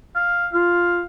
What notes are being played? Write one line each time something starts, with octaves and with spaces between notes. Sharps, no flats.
F5
F4 F5